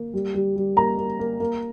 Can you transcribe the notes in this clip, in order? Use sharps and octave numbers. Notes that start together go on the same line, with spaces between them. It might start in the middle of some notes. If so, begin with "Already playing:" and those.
Already playing: A#3
G3
G3
G3
A#3 A#5
A#3
A#3
A#3